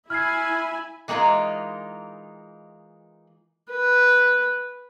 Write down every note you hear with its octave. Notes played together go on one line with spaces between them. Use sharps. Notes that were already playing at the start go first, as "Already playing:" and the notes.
E4 E5 G#5 B5 F6 G#6 C7
E3 G#3 A#3 B3 D#4 F4
B4